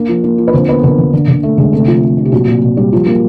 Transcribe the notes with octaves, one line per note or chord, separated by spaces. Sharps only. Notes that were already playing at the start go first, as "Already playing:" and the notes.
Already playing: A#3 D4
F3
A#3
F3
B4
D3 C4 C5
A#3 B3 B4
D3 A#3 A#4
D3
D3
D3
A3 A4
D3 G#3 G#4
C3 A3 A4
F3 F4
F3
C3
G4
A#2 F#3 F#4
A#2
A#2
G3
F3
A#3